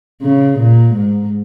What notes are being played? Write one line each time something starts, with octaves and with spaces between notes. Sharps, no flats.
C#3
A#2
G#2